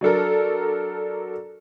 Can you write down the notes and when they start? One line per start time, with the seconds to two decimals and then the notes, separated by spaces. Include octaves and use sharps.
0.01 F#3 D4 A4 A#4